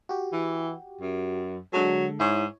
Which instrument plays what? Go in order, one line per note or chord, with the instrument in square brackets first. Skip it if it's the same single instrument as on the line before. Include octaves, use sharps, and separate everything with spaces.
[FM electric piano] F#4 G4
[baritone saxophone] E3
F#2
[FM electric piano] D3 G#3 A4 [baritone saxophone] F#3
[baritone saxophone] G#2 [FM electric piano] E4 C#5